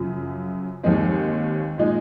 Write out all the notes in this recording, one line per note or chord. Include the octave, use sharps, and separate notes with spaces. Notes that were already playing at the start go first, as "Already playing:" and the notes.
Already playing: F#2 C#3 F3
D#2 D#3 G#3 C4
A#2 G#3 D#4